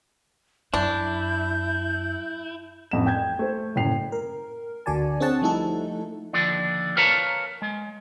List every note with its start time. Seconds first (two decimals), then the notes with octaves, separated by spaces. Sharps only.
0.74 F#2 D4 E4 G6
2.91 A1 F2 E7
3.06 G5 G6 G#6
3.39 A3 C5
3.76 F#1 A2 G5 C7 F7
4.12 A#4
4.86 D2 D3 F#4 D5 G#5 A5
5.20 C4 D4 G#4 C#5 F#5 A5
5.41 F3 G3 A3 D#4 E4 A4
6.33 D#2 D3 F3 D4
6.97 A#4 B4 C#5 F5 A5 A#5
7.62 G#3